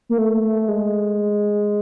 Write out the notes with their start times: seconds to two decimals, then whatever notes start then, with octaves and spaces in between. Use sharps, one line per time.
0.09 A#3
0.18 A3
0.43 A3
0.69 G#3